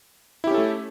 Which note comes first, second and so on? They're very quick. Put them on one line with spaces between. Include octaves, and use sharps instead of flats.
E4 G4 C#4 A4 A3